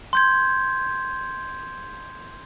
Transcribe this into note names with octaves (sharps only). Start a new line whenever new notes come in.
C6 G6 G#6